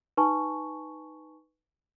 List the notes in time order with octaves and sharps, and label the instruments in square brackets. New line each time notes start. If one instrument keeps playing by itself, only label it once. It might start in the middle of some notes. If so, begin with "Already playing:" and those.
[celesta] D#4 B4 G#5 A5 C#6